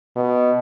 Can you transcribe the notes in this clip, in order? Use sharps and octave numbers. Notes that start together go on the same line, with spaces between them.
B2